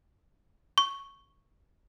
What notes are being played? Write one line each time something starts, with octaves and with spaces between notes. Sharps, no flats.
C#6